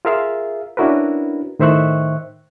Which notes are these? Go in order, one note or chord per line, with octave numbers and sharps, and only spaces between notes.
F4 G#4 A#4 E5 F5
C#4 D4 E4 F#4 A#4 B4
A2 D#3 C5 E5 C#6 F#6